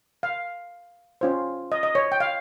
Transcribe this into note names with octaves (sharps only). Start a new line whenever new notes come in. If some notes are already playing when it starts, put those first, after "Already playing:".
F5
C#4 F4 C5
D#5
D#5
C#5
G5
F5